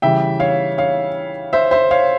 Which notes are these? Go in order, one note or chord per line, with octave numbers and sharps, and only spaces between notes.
C#3 E3 G3 E5 G5
C#5 F5
C#5 F5
C5 E5
C5 E5
C#5 F5